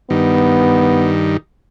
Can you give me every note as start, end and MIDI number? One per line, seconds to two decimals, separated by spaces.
0.10 1.37 43
0.10 1.37 51
0.10 1.11 59